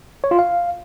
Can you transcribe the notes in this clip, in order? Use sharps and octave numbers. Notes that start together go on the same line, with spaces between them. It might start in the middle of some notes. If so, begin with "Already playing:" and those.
C#5
F4
F5